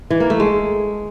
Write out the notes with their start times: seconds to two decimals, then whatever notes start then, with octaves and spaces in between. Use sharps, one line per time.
0.10 E3
0.20 A#3
0.30 A3
0.40 G#3